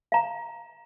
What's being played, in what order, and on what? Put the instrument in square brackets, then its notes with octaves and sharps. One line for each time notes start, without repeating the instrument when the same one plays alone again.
[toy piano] F5 A#5